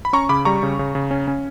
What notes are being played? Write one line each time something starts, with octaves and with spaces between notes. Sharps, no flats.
B5
C#4 A#5 C#6
C#3 B5 D6
G3 A#5 C#6
C#3
C#3
C#3
C#4
C#4